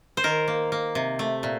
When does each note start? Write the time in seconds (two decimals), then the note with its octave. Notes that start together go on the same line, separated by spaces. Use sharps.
0.17 C5
0.24 D#3 A#4
0.48 A#3
0.72 A#3
0.95 C3
1.19 A3
1.43 A#2